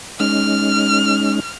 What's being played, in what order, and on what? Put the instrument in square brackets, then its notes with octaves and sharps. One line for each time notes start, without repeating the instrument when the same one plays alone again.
[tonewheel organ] G#3 C#4 D#4 [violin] F6